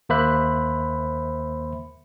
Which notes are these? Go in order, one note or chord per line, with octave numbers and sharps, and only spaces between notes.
D#2 A#3 C5 E5 B5 F#6